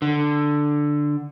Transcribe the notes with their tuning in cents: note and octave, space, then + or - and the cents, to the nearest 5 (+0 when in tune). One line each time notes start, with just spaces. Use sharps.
D3 +5